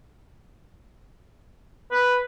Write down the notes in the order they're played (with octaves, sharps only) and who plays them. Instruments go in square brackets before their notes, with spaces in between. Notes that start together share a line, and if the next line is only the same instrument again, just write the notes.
[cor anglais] B4